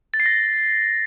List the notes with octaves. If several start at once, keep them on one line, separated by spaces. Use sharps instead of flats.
A6
C7
A#6